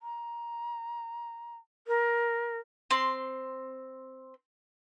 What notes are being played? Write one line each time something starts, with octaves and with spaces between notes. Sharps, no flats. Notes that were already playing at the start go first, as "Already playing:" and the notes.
A#5
A#4
C4 C6